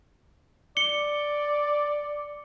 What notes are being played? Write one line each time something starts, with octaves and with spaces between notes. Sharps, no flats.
D5 C#7 G7